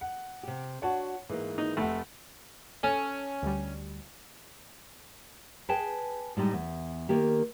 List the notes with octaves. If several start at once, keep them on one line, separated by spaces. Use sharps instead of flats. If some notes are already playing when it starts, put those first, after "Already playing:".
F#5
C3 G4
D4 F#4 C#5 F#5 A5
G#2 E3 A#3
D#4
F1 A3 F#5
C#4 A4
D2 G3
G#4 B4 G5 A5
A2 G3 G#3 D#4
E2
D#3 A#3 G4